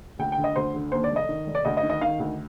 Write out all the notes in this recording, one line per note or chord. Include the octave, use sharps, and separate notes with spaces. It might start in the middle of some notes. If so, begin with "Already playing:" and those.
D2 G5
G5
D3
D#5
D2 C5
D3
D#2 C5
D5
F1
D#5
D#3
F1
D5
D2 D#5
D#5
D#3
D#5
D#3 F5
D2